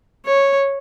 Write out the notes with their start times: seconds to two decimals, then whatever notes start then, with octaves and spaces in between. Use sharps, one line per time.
0.25 C#5